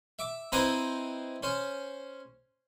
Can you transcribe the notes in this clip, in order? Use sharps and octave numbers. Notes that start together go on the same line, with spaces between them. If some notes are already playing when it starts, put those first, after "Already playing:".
E5 D6
C4 D#4 E4 B4 C5 D#5
C#4 C5